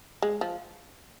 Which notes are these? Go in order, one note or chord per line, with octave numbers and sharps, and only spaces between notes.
G#3
F3